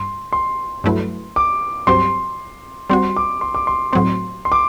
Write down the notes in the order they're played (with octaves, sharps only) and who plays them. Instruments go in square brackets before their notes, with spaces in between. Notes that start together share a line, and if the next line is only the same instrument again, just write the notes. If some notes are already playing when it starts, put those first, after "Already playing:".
Already playing: [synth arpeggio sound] G2 [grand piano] C6
[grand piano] C6
[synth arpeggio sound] G2 F#3 A3 E4 B4
[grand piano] D6
[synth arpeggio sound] G2 F#3 C4 G4 C5 [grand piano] C6
[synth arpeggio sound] G3 C4 F#4 [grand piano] C6
[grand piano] D6
C6
D6
C6
[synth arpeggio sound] A2 F#3 C4 [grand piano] C6
[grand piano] C6
D6